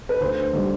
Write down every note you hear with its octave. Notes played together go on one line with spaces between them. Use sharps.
B4
D2 C5
D3 G3